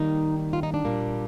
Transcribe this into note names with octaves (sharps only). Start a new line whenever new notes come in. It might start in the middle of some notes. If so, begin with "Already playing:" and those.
Already playing: D#3 G3 A#3 D#4
F4
D#4
D4
A#2 G3 A#3